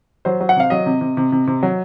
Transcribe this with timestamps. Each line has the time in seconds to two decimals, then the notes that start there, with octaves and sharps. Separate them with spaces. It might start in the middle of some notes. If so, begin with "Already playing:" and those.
0.25 F#3 C5
0.40 F#3
0.49 F#5
0.56 C3 F5
0.70 F#3 D#5
0.86 C3
1.01 C3
1.17 C3
1.32 C3
1.47 C3
1.63 F#3